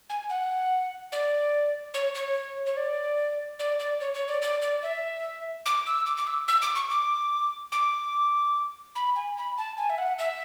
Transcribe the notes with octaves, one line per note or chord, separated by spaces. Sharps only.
G#5
F#5
D5
C#5
C#5
C#5
D5
D5
D5
C#5
C#5
D5
D5
D5
E5
D6
E6
D6
D6
E6
E6
D6
C#6
D6
D6
B5
G#5
B5
A5
G#5
E5
F#5
E5